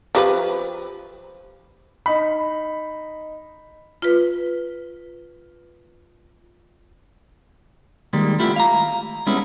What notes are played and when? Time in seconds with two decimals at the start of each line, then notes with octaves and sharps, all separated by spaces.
0.15 F3 G4 B4
2.06 D#4 B5
4.02 F4 B4
8.13 D#3 G3 G#3 A#3
8.39 A3 B3 E4 F4 G4
8.56 F5 A#5
9.27 G3 G#3 B3 C#4 E4